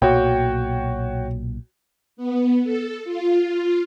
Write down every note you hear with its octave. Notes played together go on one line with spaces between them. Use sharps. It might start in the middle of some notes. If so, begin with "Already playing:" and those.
B1 A#2 F#4 C#5 G5
B3
A4
F4